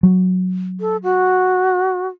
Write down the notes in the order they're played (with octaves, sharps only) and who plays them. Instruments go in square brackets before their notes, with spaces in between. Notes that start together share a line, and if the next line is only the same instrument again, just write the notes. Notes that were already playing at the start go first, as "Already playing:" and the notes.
[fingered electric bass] F#3
[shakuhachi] A4
F#4